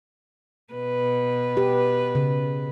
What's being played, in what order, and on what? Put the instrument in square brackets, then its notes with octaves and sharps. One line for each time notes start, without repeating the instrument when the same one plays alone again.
[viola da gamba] B2 B4
[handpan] G4
C#3